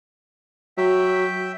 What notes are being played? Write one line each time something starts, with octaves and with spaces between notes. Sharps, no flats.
F#3 E5 G5